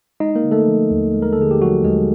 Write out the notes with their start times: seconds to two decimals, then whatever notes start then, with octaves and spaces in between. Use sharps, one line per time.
0.20 G#3 D#4 D#5
0.35 A#3 A#4
0.44 D3
0.52 A3 A4
0.67 F3
0.91 D#2
1.14 G#3
1.22 A#4
1.33 A4
1.38 D3 G#4
1.51 G4
1.61 F3 F#3 F#4
1.84 D#2 G#3 G#4